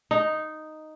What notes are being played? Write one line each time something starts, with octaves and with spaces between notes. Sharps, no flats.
D#4